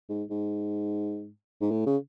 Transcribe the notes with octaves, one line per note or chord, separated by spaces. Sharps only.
G#2
G#2
G#2
A2
C#3